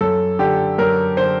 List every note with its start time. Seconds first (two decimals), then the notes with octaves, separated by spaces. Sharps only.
0.01 F#2 A4
0.39 D3 G4
0.78 F#2 A#4
1.17 D3 C5